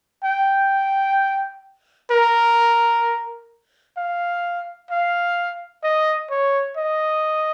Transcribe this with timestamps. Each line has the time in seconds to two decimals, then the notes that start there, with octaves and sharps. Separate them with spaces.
0.24 G5
2.11 A#4
3.97 F5
4.91 F5
5.83 D#5
6.31 C#5
6.77 D#5